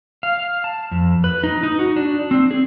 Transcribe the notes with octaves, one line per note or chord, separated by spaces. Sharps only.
F5
A5
F2
B4
D#4
D#4
F#4
D4
C4
G#4